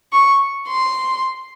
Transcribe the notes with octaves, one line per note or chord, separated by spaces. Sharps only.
C#6
C6